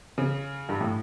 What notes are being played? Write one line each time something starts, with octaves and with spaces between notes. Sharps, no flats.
C#3
G2
A2